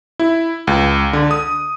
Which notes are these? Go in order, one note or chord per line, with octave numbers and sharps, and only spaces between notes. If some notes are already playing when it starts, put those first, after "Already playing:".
E4
C#2
D3
D#6